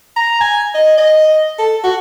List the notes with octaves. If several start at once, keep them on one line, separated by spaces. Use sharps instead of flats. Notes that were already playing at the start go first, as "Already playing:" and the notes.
A#5
G#5
D#5
D#5
A4
F#4